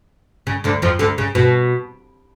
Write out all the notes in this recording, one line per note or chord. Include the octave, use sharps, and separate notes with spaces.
C#3
D2 D3
F2 F3
D2 D3
C#3
B2